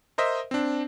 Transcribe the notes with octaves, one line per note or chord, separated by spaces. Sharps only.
A#4 C5 D#5 E5
C4 D4